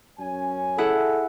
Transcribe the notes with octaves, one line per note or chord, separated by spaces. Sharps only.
F#2 C#4 G#5
E4 G#4 A4 F#5